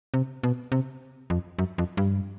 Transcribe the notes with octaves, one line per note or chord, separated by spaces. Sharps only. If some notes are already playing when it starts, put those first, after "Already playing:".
C3
B2
C3
F2
F#2
F2
G2